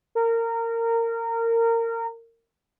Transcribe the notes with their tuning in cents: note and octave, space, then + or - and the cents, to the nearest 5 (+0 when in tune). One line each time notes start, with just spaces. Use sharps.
A#4 -25